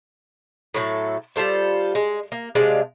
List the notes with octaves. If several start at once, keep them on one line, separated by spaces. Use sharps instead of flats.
A2 F#3 A4
G3 F4 A4 C5
G#3
A#3
C3 G#3 D4 F5